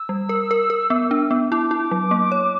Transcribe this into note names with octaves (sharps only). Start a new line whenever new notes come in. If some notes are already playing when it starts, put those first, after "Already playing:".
Already playing: E6
G3
A#4
A#4
A#4
B3
D4
B3
E4 D6
E4
F#3
A#3
C#5